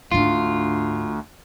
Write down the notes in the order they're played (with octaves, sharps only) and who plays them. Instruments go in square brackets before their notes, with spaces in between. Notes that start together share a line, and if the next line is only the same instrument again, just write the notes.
[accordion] D2 [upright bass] G#2 D4 [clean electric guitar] F4